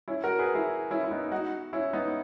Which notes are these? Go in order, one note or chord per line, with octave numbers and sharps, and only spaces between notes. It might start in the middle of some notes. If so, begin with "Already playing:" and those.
C#4 E4
F#4 A#4
G#4 B4
E4 G#4
C#4 E4
E4
B3 D#4
D#4 F#4
C#4 E4
B3 D#4